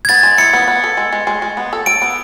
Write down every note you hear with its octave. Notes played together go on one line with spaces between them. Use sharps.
G#6
B3 A6
G#3
E4 C#7
B3
B3
A4
G#3
G#3
G#3
G#3
B3
A4
A4 D7
B3